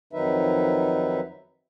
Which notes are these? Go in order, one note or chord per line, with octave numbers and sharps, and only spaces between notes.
F2 D#3 F#3 D#4 B4 E5